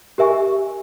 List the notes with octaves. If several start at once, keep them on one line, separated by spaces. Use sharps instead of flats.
G4 A#4 E5 G#5 C#6